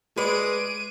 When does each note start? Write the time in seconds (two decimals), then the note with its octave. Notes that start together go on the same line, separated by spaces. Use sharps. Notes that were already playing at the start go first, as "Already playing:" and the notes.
0.17 G#3 B4 D5 D7 D#7